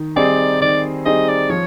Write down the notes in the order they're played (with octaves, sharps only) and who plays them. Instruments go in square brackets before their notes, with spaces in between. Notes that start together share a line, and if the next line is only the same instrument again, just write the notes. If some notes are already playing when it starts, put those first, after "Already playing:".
Already playing: [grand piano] D#3
[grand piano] G3 C4 D#4 G#4 [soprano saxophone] D5
[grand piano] D#3 [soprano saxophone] D5
[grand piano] G3 C4 D#4 G#4 [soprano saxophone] D#5
[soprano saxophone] D5
[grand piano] F3 [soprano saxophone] C#5